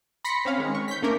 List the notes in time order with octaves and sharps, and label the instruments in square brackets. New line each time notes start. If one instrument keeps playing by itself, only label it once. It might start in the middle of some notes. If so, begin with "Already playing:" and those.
[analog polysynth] B5 C6 A#6 B6 C#7
C4 C#4 F5
D#3 G#3
C#6
G6 B6
A3 A#3 C#4 D4 A#4